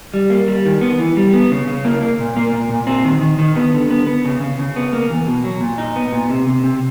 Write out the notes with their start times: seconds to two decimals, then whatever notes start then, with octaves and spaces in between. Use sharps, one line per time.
0.14 G3
0.30 A#3
0.48 G3
0.66 D#3
0.81 B3
0.99 E3
1.17 G3
1.33 B3
1.51 C#3
1.68 C#3
1.85 A#3
2.01 A#3
2.19 A#2
2.37 A#3
2.53 A#2
2.70 A#2
2.87 C4
3.05 D#3
3.21 D#3
3.39 D#3
3.56 B3
3.73 D3
3.91 B3
4.07 B3
4.25 C#3
4.41 C#3
4.59 C#3
4.76 B3
4.93 A#3
5.10 E2
5.27 B2
5.44 F#3
5.61 A#2
5.78 D#4
5.96 B3
6.12 A#2
6.29 C3
6.47 C3
6.64 C3